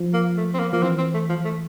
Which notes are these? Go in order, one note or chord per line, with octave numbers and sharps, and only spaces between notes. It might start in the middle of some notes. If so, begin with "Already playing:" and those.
Already playing: F3
A#3
A3
C4
A#3
F3 A#3
E3 C4
C4
A3
F3
A3